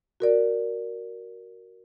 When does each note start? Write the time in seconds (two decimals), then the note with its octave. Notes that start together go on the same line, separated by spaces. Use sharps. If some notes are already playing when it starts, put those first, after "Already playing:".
0.20 F#4 A#4 D5